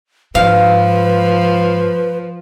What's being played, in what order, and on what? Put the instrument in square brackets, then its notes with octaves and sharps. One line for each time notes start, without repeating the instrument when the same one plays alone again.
[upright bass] G#2 [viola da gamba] F3 [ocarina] B4 [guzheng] F5